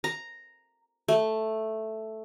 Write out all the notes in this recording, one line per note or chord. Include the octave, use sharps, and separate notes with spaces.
A#5
A3